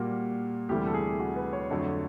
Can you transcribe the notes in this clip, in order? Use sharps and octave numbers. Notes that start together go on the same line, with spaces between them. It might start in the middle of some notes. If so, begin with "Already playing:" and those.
Already playing: A#2 G3 A#3 F#4
D2 C3 E3 G3 G4
A4
G#4
F#4
B4
C#5
F2 D3 F#3 A3